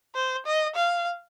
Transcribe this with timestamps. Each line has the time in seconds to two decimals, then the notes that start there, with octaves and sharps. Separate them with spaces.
0.15 C5
0.46 D#5
0.75 F5